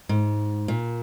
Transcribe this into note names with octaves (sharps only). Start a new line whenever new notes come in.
G#2
A#2